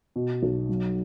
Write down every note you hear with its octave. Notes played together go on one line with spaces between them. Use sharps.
B2
B1
F#3